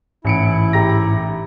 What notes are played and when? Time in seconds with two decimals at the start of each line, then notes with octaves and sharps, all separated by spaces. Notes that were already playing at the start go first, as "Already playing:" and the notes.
0.25 A1 G#2 E4 C#7 D7
0.73 G4 A#5 A#6